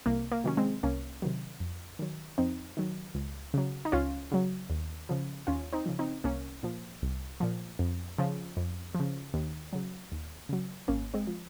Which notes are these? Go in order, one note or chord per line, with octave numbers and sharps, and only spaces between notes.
C2 A#3
A#3
C3 D#3 F#3 C#4
G#3 C4
C2 A#3 C#4
C3 D#3 F#3
F2
D#3 F#3
F2 C4 D#4
D#3 F#3
C#2
C#3 F#3
D#4
C#2 C#4 F4
C#3 F#3
D#2
C#3 F3
D#2 C#4 F4
C4 D#4
C#3 F3
C4 D#4
C2 A#3 C#4
A#2 F3
C2
A#2 F3
F2
C#3 F3
F2
C#3 F3
D#2
C#3 F#3
D#2
C#3 F#3
G#1 A#3 C#4
G#3 C4
F3